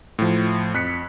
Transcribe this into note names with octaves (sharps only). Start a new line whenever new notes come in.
A2 F3
F2 F#6 B6 C#7